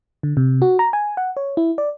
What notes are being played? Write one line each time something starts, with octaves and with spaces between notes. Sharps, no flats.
D3
C3
F#4
A#5
G#5
F#5
C#5
E4
D5